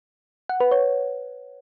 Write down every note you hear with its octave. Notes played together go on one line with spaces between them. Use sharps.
F#5
B4
C#5